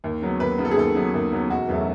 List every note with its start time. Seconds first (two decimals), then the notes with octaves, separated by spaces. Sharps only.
0.04 D#2
0.22 C#3 F#3 B3
0.40 D#2 B4
0.58 C#3 F#3 B3
0.65 A4
0.71 G#4
0.76 D#2 A4
0.95 C#3 F#3 B3
1.14 D#2
1.32 C#3 F#3 B3
1.49 E1 F#4
1.68 E2 C#3 F#3 A3